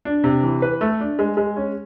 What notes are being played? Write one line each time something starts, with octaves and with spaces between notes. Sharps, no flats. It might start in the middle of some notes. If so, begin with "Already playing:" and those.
D4
C3
E3
B4
A3
D4
G#3
G#3
C#4